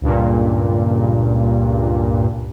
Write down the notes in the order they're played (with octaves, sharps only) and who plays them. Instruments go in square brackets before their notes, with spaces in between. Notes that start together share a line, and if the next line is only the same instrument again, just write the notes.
[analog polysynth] C#2 G2 A#2